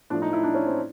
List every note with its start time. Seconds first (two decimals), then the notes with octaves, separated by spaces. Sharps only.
0.10 A2 F3 A3 D4
0.22 D#4
0.33 E4
0.43 D4
0.54 C#4
0.66 C4